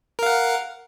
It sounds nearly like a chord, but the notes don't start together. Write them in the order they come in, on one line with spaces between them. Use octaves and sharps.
A#4 F5 F#5